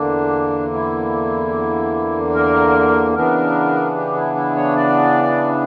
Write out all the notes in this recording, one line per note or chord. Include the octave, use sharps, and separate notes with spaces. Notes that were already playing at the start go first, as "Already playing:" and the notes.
Already playing: E2 D3 A#3 D4
E4
A#4
C#3 E3 B3 D4 A#4
G4
E4
E4
C#5
D5